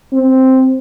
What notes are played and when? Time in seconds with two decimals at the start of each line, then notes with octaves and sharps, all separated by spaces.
0.13 C4